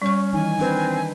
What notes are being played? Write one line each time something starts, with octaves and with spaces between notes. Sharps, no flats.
G3 C#4 C#6
D#3 E3 D#4 G#5
C4 D4 B4